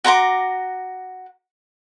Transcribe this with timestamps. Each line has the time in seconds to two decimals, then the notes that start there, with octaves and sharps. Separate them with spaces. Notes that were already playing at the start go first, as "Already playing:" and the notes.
0.04 F#4 A#5 C6 D6